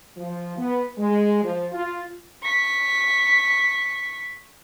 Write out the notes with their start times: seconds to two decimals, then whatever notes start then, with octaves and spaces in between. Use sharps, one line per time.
0.16 F3
0.57 B3
0.98 G#3
1.43 F3
1.71 F4
2.43 C#6 B6